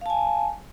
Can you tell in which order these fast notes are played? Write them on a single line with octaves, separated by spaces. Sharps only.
F5 A5 G#5